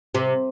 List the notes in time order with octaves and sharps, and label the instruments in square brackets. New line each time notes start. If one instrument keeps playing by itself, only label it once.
[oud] C3